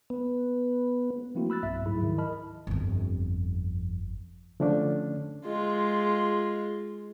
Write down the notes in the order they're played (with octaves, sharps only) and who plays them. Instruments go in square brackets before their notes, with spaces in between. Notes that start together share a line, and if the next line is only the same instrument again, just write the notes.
[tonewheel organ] B3
[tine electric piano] F3 A3 A#3 C4 E4 F#4
B5 E6 F#6 A6
B1 G2 E5
D2 G#2 F#3 E4 G#4 B5
D#3 F3 E4
A#4 D#5 A5 B5 F6
[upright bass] G1 F2
[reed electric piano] D3 F3 A3 C#4 D4
[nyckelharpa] G#3 F4